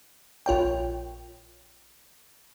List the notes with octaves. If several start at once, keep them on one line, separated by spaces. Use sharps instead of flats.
A#1 F4 C#5 G5